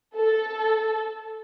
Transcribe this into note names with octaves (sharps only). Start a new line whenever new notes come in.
A4